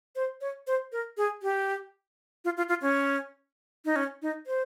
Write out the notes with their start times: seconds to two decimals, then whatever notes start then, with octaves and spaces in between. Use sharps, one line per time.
0.16 C5
0.41 C#5
0.67 C5
0.92 A#4
1.17 G#4
1.43 G4
2.45 F4
2.57 F4
2.69 F4
2.82 C#4
3.85 D#4
3.96 C#4
4.22 D#4
4.47 C5